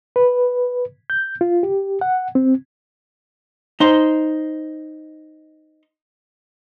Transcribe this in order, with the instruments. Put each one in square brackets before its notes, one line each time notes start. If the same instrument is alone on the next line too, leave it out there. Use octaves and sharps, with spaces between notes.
[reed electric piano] B4
G6
F4
G4
F#5
C4
[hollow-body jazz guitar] D#4 C5